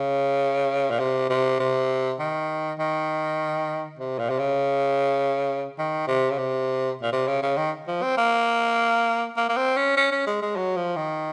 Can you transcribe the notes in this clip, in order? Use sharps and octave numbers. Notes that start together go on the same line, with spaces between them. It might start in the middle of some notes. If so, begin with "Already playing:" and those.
Already playing: C#3
A#2
C3
C3
C3
D#3
D#3
C3
A#2
C3
C#3
D#3
C3
C#3
C3
A#2
C3
C#3
C#3
D#3
F3
C4
A#3
A#3
A#3
C4
C#4
C#4
C#4
G#3
G#3
F#3
F3
D#3